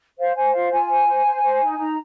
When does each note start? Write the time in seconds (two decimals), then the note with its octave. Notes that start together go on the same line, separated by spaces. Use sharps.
0.19 C5 F5
0.36 C5 G#5
0.54 F4 F5
0.72 F4 G#5
0.90 C5
1.07 C5
1.25 C5
1.42 C5
1.60 D#4
1.78 D#4 A#5